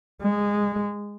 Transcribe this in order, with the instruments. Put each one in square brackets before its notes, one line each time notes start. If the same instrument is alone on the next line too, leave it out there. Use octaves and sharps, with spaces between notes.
[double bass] G#3